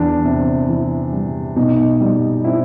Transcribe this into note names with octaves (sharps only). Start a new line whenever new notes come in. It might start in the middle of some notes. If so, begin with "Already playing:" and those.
Already playing: E2 D4
C3
E3
G3
B2 D#4
G3
C4 E4